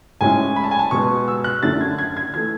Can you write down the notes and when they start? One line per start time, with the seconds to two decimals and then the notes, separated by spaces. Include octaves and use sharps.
0.21 A2 G#3 C#4 E4 G#5
0.56 B5
0.64 A5
0.71 G#5
0.79 A5
0.91 B2 G#3 B3 C#6
1.28 E6
1.44 F#6
1.63 F#2 D3 A3 E4 A6
1.81 G#6
1.98 G#6
2.17 G#6
2.34 E3 A3 G#6